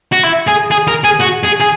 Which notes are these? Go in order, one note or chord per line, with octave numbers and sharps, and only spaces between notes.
F#4
E4
G#4
G#4
A#4
G#4
F#4
G#4
G#4